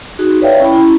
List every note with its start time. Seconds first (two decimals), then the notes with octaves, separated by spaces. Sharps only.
0.19 D#4 F#4 G#4
0.41 B4 C#5 D5 E5 F5 G5
0.60 C#4 E4 G5 B5
0.73 C#4 E4